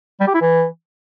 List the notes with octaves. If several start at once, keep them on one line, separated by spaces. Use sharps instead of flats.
G3
G4
E4
E3